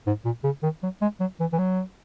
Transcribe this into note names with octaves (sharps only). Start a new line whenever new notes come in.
G#2
A#2
C#3
D#3
F#3
G#3
F#3
E3
E3
F#3